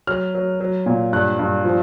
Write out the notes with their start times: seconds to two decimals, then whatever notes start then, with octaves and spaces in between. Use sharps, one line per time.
0.07 F#3 F6
0.35 F#3
0.60 F#3
0.86 A#2
1.13 G2 F#6
1.39 G2
1.64 F3